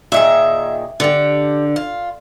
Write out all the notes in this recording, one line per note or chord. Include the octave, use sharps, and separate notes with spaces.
A#2 D#3 G#4 E5
D3 D4 G4
F4